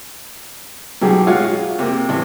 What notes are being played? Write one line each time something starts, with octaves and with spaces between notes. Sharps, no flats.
B1 F#3 G4 G#4
G#3 F4 G#4 C#5 F5 F#5
F4
C3 A#3
A1